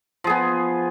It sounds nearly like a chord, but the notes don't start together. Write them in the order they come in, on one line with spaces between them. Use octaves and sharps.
F3 G#4 B3